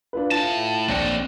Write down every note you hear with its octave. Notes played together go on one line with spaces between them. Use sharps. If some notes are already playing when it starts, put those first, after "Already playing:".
D4 F4 B4
A2 F4 A5
A#1 C4 D4 A#6 C#7